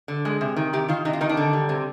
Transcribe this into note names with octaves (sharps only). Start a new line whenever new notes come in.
D3
G#3
C3
D#3
C3 G4
D#3 F4
C3 D#4
F4
D#3 D#4
D4
D3
G3
C3